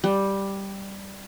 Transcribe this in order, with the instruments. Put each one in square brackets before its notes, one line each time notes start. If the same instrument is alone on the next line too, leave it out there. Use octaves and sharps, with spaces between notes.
[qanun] G3